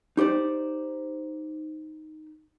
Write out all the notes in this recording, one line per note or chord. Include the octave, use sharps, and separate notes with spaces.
D#4 G4 C5 D5